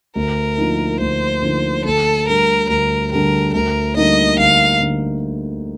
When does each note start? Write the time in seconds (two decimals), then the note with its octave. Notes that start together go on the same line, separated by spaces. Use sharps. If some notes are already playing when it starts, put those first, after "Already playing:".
0.15 D2 A#4
0.58 D3 F3 A#3 D#4
1.00 D2 C5
1.42 D3 F3 A#3 D#4
1.84 D2 A4
2.27 D3 G3 A#4
2.69 D2 A#4
3.12 D3 G3 A#4
3.54 D2 A#4
3.97 D3 G3 A#3 D#4 D#5
4.39 D2 F5
4.80 D3 A#3